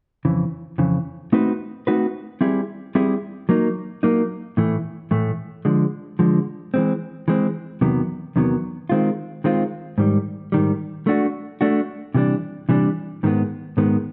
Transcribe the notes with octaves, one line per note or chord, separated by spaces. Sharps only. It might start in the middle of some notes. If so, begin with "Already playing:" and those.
F2 C#3 E3
F2 C#3 E3
A3 C4 D#4 F#4 B4
A3 C4 D#4 F#4 B4
G3 C4 E4 G#4
G3 C4 E4 G#4
F#3 A#3 D#4
F#3 A#3 D#4
A2 E3 A3
A2 E3 A3
D3 F3 G#3
D3 F3 G#3
E3 G#3 C4
E3 G#3 C4
E2 C3 D#3 F#3 B3
E2 C3 D#3 F#3 B3
D#3 G#3 C4 F4
D#3 G#3 C4 F4
G#2 D#3 G3
G#2 D#3 G3
A3 D4 F#4
A3 D4 F#4
C3 E3 G3 B3 D4
C3 E3 G3 B3 D4
G#2 D#3 G#3 B3
G#2 D#3 G#3 B3